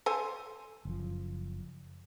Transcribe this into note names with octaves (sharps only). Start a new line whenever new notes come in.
A4 C5 G#5
F#1 F3